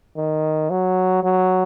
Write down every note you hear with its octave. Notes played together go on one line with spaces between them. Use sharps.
D#3
F#3
F#3